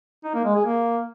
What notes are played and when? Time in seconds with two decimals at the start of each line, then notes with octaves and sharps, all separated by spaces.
0.24 D#4
0.34 A#3
0.45 G#3
0.55 G#4
0.66 A#3